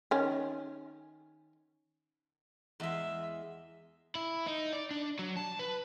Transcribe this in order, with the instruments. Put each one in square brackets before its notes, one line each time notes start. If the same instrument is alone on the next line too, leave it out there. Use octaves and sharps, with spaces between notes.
[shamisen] D#3 C#4
[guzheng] E2 G#3 [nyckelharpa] E5
[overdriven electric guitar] E4
D#4
D5
D4
F#3
A5
B4